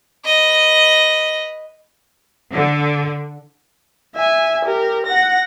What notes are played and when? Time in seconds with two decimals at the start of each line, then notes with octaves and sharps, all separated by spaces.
0.25 B4 D#5
2.54 D3
4.16 E5 G#5
4.65 G4 A#4
5.06 F#5 A#6